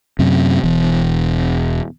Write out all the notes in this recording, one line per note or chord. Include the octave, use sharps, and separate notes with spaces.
F#2 C3
E1 E2